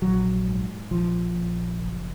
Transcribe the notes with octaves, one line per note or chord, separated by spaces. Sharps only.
A#1 F#3
G#2
A#1 F3
A#1
F#1